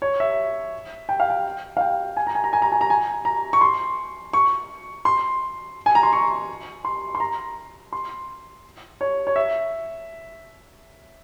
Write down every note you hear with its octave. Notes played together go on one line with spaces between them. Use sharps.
C#5
E5
G5
F5
G5
F5
G5
G#5
A#5
G#5
A#5
G#5
A#5
G#5
A#5
G#5
A#5
C#6
C6
C#6
C6
G#5
A#5
C6
C#6
C6
C6
A#5
C6
C#5
C#5
E5